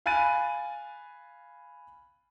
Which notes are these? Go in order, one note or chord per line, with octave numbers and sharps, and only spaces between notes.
F5 G#5 B5 F#6 A6 D#7